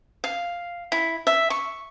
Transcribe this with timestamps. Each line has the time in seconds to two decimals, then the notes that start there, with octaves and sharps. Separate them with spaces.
0.24 F5
0.92 E4
1.27 E5
1.50 C#6